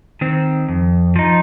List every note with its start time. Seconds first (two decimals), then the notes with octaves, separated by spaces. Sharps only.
0.21 D#3 C4
0.69 F2
1.16 F3 D#4